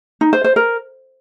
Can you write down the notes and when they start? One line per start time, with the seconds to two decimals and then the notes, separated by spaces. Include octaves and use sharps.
0.21 D#4
0.33 C5
0.44 C5
0.56 A#4